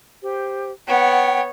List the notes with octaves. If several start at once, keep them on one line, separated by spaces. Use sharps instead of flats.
G4 C5
B3 C#5 F#5 G5